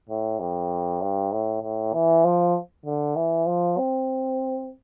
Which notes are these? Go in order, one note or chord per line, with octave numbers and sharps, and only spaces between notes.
A2
F2
G2
A2
A2
E3
F3
D3
E3
F3
C4